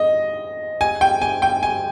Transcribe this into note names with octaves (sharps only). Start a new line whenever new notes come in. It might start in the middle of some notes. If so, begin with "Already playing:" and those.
Already playing: D#5
G#5
G5
G#5
G5
G#5